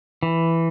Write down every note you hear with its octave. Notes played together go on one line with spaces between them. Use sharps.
E3